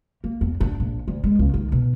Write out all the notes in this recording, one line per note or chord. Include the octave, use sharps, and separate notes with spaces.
A#3
E2
D4
A#1
D2
G#3
C#2
D#3
B2